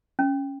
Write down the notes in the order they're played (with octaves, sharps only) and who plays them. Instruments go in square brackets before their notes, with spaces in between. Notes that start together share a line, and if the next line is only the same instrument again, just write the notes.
[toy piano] C#4